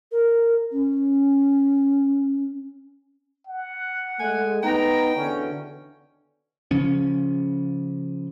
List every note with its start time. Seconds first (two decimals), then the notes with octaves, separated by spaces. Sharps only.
0.12 A#4
0.72 C#4
3.47 F#5
4.19 G#3 A3 G#5
4.63 B3 D#4 G5 A#5
5.15 E2 B2 D3 C#4
6.71 C#3 F3 C#4